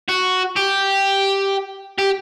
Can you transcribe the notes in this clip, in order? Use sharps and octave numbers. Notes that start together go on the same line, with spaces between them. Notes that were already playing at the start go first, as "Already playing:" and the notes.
F#4
G4
G4